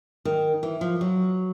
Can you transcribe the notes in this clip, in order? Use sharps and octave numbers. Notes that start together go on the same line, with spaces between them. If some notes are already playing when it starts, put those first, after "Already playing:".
D#3
E3
F3
F#3